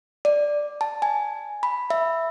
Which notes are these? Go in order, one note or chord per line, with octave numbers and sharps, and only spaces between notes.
D5
A5
G#5
B5
E5